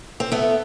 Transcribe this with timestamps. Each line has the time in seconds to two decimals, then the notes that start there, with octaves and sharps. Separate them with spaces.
0.20 C4
0.32 A3 B3